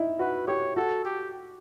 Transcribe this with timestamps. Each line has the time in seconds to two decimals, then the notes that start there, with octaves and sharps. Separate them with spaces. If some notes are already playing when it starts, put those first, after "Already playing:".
Already playing: D#4 E4
0.19 F#4 B4
0.47 G4 C#5
0.76 F#4 A4
1.05 G4